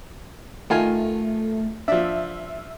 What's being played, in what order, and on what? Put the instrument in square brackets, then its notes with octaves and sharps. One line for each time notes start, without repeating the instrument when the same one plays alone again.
[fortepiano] D#3 F4 G#5 [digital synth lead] A3
[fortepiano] F3 D4 [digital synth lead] E5